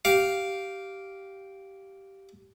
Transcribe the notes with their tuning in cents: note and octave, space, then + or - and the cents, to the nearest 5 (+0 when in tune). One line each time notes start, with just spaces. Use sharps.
G4 -10 F5 +0